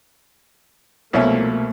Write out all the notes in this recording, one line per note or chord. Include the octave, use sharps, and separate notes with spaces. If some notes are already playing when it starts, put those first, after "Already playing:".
C2 B2 F3 A3 A#3 C#4 E4